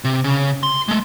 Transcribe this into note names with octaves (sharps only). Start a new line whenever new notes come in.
C3
C#3
C6
G#3 A3